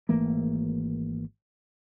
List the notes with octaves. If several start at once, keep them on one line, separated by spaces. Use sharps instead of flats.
G#1 E3 A3 A#3